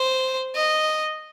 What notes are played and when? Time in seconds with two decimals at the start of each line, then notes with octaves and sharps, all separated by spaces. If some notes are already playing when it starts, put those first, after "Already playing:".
Already playing: C5
0.56 D#5